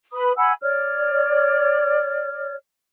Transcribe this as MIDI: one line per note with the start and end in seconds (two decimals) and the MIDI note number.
0.13 0.32 71
0.13 0.32 83
0.13 0.32 87
0.37 0.53 78
0.37 0.53 80
0.37 0.53 83
0.37 0.53 88
0.62 2.54 73
0.62 2.54 74
0.62 2.54 89